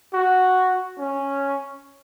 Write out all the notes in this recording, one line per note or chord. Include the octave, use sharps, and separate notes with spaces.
F#4
C#4